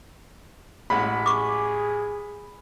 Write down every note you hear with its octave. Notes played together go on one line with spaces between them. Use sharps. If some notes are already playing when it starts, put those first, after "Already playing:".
A1 G#3 F#5 B5
G#4 C#6 D6